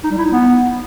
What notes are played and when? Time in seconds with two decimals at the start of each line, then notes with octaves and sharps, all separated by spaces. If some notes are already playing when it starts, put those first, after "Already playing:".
0.04 D#4
0.11 G3
0.18 E4
0.25 D#4
0.32 B3